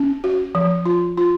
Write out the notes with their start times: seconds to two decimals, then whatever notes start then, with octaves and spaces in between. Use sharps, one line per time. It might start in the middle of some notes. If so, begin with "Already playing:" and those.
Already playing: C#4
0.24 F#4
0.55 F3
0.86 F4
1.18 F4